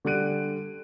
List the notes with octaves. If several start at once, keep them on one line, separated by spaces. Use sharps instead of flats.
D3 G3 F#6 D7 D#7